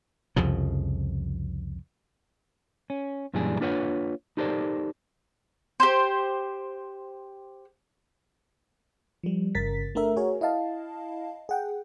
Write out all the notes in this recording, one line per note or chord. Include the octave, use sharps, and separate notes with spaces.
C2 F2 C#3 F3
C#4
F#2 A#2 E3 G3 D4 G#4
A#3 D4 F4 B4 C#5 F#5
D#4 G4 A4 A#4 C5 D5
G4 C5
F3 G3
G1 G2 C#3 A#4 A6 B6
A3 D4 A#4 E5
F#4 G#4 A#4 C#5
E4 D#5 F5 A5
G#4 F#5 G5